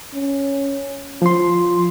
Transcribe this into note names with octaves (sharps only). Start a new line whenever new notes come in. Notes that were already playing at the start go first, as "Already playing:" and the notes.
C#4
F3 F4 C6